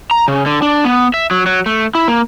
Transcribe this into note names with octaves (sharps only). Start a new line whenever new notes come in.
A#5
C#3
D3
D4
B3
E5
F#3
F#3
A3
E4
A#3